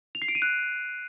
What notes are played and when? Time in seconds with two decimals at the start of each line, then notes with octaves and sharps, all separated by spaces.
0.15 F7
0.22 C7
0.28 D7
0.35 D#7
0.42 F#6